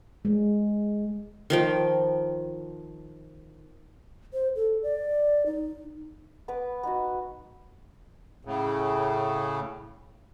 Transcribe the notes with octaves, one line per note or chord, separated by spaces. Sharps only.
G#3
D#3 F3 G5
C5
A4
D5
D#4
B3 B4 D6
B3 D#4 F#4
A2 C#3